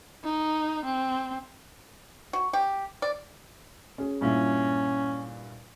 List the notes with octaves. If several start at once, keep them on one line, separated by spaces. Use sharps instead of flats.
D#4
C4
F#4
G4
D5
C#4 G#4
G2 A#2 C#4 E4